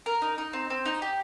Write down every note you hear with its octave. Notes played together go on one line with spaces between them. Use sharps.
A#4
D#4
D#4
C4
C4
D#4
G4